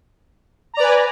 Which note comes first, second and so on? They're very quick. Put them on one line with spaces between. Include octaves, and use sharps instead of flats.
A#5 D5 B4 G#5